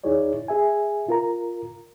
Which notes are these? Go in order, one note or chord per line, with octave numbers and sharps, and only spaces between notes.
D#2 D#4 E4 G#4 C#5 D5
G#4 E5 G#5
F4 A#4 A#5